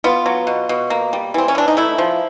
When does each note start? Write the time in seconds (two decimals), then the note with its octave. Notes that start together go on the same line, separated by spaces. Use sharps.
0.04 B3 F4
0.26 F#3
0.47 B2
0.69 B2
0.90 A#3
1.13 G3
1.34 E3 C4
1.48 C#4
1.55 E3 D4
1.68 D#4
1.77 A3 E4
1.98 F3